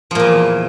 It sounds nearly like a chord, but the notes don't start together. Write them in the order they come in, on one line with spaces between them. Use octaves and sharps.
F3 A#2 E2